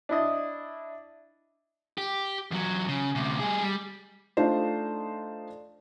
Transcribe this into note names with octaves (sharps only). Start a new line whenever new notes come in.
D4 E4 D#5
G4
E2 F#3
C#3
D2 C3
G3 G#4
G3
A3 D4 D#4 F4 C5